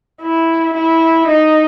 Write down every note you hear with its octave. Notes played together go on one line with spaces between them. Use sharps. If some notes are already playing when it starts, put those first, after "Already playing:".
E4
E4
D#4